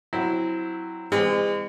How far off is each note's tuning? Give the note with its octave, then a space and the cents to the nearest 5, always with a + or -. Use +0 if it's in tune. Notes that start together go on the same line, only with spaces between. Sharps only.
F#3 +0 C4 +0 E4 +0
E3 -5 G#3 -40 C4 -45